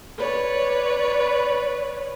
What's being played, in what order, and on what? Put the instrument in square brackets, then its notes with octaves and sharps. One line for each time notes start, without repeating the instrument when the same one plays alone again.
[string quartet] B4 C#5 D5